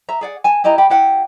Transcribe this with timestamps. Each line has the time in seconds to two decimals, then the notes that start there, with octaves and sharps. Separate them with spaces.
0.09 E5 A#5
0.21 G#4 D5 F#5
0.44 G#5 A5
0.64 E4 G4 D#5 A#5
0.78 G4 B5
0.90 E4 G4 F#5